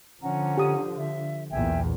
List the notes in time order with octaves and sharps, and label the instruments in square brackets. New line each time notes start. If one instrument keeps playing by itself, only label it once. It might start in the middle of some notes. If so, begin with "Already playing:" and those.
[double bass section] D3 F3 [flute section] C#4 F#5 A#5
[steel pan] G4 D#6
[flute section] E5
[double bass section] B1 E2 A#2 [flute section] E5 G5 G#5